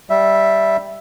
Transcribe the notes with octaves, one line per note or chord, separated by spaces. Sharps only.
G3 E5